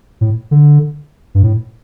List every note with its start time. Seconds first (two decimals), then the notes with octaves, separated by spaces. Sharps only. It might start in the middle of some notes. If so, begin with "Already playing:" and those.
0.21 A2
0.51 D3
1.35 G2
1.43 A2